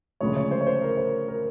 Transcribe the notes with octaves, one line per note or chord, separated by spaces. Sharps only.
D2 C#3 F3 G#3 C#5
C#5
C5
C#5
C5
A#4
C5
A#4